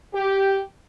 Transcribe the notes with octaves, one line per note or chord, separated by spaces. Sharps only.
G4